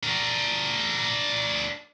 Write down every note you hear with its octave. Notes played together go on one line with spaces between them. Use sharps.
D4 A#4